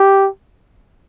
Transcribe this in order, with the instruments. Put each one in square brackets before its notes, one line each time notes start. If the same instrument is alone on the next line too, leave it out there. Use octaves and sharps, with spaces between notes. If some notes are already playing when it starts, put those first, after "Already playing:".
Already playing: [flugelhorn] G4